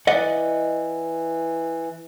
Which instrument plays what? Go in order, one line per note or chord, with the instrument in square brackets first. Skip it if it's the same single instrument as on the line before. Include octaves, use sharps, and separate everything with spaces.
[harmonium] E3 [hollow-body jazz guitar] D5 D#5 F#5